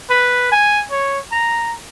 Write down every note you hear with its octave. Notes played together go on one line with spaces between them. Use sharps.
B4
G#5
C#5
A#5